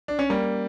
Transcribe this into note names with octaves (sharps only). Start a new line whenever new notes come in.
D4
C#4
G3 A#3